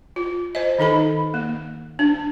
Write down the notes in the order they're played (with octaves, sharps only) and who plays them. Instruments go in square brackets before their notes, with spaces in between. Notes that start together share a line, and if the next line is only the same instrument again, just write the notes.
[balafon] F4
C5 D#5
D#3 D#4 A4 B5
A#3
D4